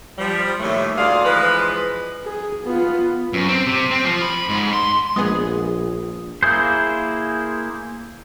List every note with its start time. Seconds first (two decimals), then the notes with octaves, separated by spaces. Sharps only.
0.18 F3 G3
0.60 D#2 A2 A3
0.97 D2 F4 G#4 D5 F5
1.24 E3 F3 G#3 B4
2.23 G#4
2.64 B3 F4
3.33 F#2
3.49 C4
3.67 C3
3.91 C4
4.05 F3
4.22 B5
4.49 G#2
4.73 C6
5.16 A#1 G#3 B3 G#4 D#6
6.43 A#3 E4 G#4 C5